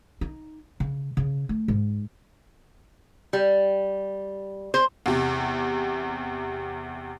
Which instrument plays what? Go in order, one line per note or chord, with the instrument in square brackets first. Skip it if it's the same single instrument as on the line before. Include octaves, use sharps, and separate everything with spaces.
[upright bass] D#4
C#3
C#3
A3
G#2
[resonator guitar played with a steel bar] G3
C5
[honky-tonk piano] E2 C3